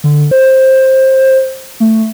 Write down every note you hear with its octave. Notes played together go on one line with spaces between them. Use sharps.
D3
C5
A3